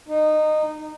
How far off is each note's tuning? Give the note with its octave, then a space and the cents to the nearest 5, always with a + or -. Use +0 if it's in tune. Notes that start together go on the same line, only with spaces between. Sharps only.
D#4 -15